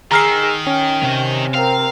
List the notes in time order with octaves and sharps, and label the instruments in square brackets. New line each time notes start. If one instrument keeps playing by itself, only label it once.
[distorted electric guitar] D#3 [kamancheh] G#4 E6 [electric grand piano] A#5 F6 C7
[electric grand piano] C#4 [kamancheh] G5
[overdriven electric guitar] C3
[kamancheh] C4 A#4 [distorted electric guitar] F5